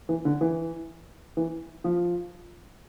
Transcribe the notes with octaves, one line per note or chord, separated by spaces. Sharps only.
E3
D3
E3
E3
F3